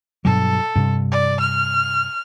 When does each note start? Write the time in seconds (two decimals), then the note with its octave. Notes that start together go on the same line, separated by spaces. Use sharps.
0.25 G2 B2 F#3 A4
0.75 G2 C3
1.11 D5
1.40 F6